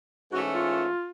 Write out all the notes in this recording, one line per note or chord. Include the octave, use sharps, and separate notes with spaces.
G#2 E3 A3 C#4 F#4
F4